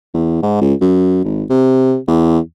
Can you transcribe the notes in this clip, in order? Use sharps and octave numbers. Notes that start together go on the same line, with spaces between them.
E2
G#2
C#2
F#2
G#1
C3
E2